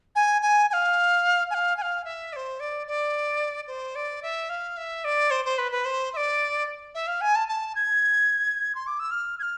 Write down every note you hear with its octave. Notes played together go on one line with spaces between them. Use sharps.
G#5
G#5
G#5
F5
G#5
F5
G#5
F5
E5
D5
C5
D5
D5
C5
D5
E5
F5
E5
D5
C5
C5
B4
B4
C5
E5
D5
E5
F5
G#5
A5
A5
G#6
C6
D6
E6
F6
G#6
F6